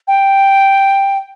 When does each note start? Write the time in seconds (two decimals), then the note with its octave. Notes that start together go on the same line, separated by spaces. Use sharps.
0.07 G5